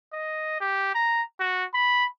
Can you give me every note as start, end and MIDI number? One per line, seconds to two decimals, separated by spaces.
0.13 0.60 75
0.61 0.94 67
0.95 1.22 82
1.40 1.65 66
1.75 2.05 83